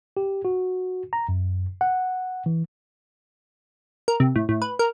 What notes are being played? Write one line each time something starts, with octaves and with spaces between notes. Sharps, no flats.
G4
F#4
A#5
F#2
F#5
E3
A#4
C3
A2
A2
B4
A#4